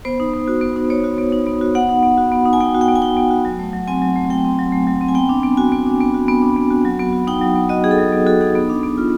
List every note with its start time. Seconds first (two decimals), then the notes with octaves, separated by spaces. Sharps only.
0.05 B3 C5
0.20 D#4
0.33 B3
0.48 F#4
0.61 B3
0.76 D#4
0.90 B3 C#5
1.04 F#4
1.18 B3
1.32 D#4
1.47 B3
1.61 F#4
1.75 B3 F#5
1.89 D#4
2.03 B3
2.18 F#4
2.32 B3
2.46 D#4
2.53 G#5
2.60 B3 G5
2.75 F#4
2.81 G5
2.88 B3
2.96 G#5
3.02 D#4 G5
3.17 B3
3.30 F#4
3.45 F#3
3.59 A3
3.73 F#3
3.88 C4 G#5
4.02 F#3
4.16 A3
4.30 F#3 G5
4.45 C4
4.58 F#3
4.72 A3
4.87 F#3
5.01 C4
5.08 G#5
5.15 B3 G5
5.29 D4
5.43 B3
5.57 F#4 G#5
5.72 B3
5.86 D4
6.00 B3
6.14 F#4
6.28 B3
6.42 D4
6.56 B3
6.70 F#4
6.85 F#3
6.99 B3
7.13 F#4
7.27 D#4 G5
7.42 F#3
7.56 B3
7.69 F#4 D#5
7.84 D#4 G#4
7.91 A4
7.98 F#3
8.12 B3
8.26 F#4 A4
8.41 D#4 G#4
8.55 B3
8.70 D4
8.83 B3
8.98 F4